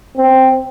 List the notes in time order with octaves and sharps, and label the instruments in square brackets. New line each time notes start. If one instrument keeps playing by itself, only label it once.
[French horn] C4